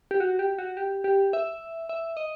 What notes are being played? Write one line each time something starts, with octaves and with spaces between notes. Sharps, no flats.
G4
F#4
G4
F#4
G4
G4
E5
E5
D#5